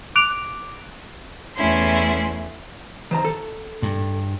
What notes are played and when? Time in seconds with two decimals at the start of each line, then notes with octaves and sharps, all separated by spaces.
0.16 D6 F#6 D7 F7
1.56 E2 A3 C#4 E4 C6
3.11 D#3 C5 A#5
3.25 A4
3.82 G2